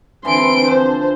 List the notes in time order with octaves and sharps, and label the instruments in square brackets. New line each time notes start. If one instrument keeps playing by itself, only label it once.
[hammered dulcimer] D3 E3 [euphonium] C4 [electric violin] C6 D7
[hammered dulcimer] D3 F3 [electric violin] C5